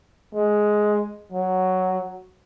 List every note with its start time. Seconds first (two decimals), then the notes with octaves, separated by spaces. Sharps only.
0.34 G#3
1.32 F#3